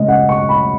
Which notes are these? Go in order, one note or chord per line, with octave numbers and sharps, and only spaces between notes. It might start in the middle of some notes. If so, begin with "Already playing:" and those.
Already playing: C#3 G#3 C#4 D#5
F#5
C#6
B5